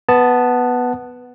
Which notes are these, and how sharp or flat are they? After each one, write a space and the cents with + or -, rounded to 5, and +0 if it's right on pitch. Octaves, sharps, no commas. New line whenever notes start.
B3 +0 A5 +0